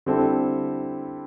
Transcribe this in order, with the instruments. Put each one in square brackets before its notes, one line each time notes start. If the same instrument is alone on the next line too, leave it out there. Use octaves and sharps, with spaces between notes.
[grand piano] D3 G3 C4 E4 A4